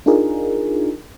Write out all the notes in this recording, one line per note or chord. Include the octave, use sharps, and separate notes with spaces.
D4 D#4 F4 G#4 A#4